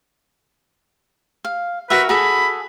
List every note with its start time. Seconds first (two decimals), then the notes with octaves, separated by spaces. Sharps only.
1.45 F5
1.90 F#4 A#4 B4 E5
2.09 F#4 G#4 A4 B5